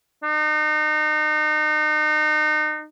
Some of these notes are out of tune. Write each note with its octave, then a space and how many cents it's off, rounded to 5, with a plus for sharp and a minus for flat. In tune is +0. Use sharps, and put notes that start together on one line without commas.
D#4 -35